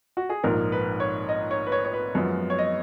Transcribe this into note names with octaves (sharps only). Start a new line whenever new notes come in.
F#4
G#4
A#1 G#2 F3 A#3 A#4
B4
C#5
D#5
C#5
B4
C#5
C#5
B4
F#2 F3 G#3 B3
C#5
D#5